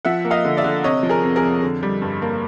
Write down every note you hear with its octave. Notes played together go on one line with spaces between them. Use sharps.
F3 E5 F#5
A#3
D#5 F5
D3
D5 E5
D3
C3 C#5 D#5
F3
G#4 A#4
F2
G#4 A#4
F2
D3
G3
G2
A#3